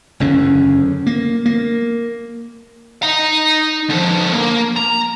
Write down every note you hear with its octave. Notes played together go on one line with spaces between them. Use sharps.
F#1 E2 D3 C#4
A#3
A#3
D#4 A#5
D3 F3
A#3
A#5